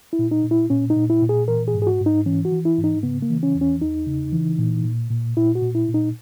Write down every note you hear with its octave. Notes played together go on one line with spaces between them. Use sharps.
E4
A#2
D#4
A#2
E4
A#2 C#4
D#4
A#2
E4
A#2
G#4
E3 A#4
G#4
G#2
G#4
F#4
G#2
D#4
E3 C#4
F#4
E3
E4
G#2
D#4
C#3 B3
A#3
E3
C#4
E2
C#4
E2 D#4
C#3
E3
A#2
A#2
A#2
A#2 E4
F#4
A#2
E4
A#2
D#4